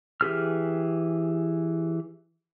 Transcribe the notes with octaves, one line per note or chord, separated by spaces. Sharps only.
E3 G4 G#4 F6